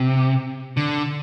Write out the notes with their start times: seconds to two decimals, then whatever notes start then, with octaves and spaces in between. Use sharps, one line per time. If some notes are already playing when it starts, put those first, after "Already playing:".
Already playing: C3
0.77 D3